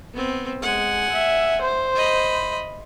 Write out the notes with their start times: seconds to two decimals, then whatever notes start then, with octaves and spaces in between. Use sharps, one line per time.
0.14 B3 C4
0.62 G#3 F#5 G#5
1.12 E5
1.63 C5
1.95 D#5 B5